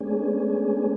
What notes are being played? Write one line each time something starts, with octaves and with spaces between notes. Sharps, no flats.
G#3 A3 B3 C#4 D4 G#4